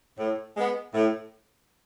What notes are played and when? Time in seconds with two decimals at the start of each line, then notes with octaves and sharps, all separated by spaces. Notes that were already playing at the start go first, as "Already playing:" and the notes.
0.18 A2
0.56 G#3 B3
0.94 A2